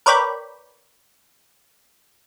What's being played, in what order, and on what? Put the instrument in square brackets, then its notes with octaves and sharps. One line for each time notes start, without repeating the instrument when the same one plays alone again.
[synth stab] A#4 B4 C#5 D5 G5 B5